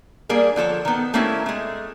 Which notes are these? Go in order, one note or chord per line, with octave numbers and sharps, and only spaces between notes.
G3 A#3 D4 G#4 A#4
D3 F3 A4 C#5
D#3 B3
G3 A3 A#3 C4 C#4 E4
G#3 A3